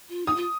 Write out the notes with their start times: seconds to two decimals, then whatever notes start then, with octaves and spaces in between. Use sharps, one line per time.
0.09 F4
0.26 D#4 D#6
0.36 F4